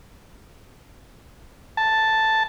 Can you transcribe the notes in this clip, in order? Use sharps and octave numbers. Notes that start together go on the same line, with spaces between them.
A5